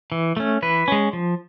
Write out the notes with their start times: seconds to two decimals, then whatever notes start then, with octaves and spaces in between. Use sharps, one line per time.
0.12 E3
0.37 A3 C#4
0.62 E3 B4
0.88 G#3 C#4
1.13 F3